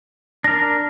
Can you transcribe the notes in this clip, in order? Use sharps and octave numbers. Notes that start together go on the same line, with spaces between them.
D4 A#4 A#6